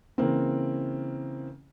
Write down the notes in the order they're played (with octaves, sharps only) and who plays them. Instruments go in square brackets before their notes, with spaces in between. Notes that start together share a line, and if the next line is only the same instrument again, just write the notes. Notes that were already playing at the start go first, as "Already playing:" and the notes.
[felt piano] C#3 E3 A#3 C4